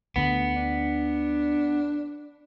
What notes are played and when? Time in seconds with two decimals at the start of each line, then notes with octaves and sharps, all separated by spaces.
0.16 D2 D3 B3
0.56 D4